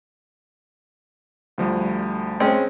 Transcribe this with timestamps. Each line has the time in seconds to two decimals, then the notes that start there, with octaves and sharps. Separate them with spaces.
1.58 D2 F3 G3
2.40 G#3 C4 C#4